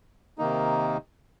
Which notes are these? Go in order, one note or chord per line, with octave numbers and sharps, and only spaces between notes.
C3 D#3 A#3 D#4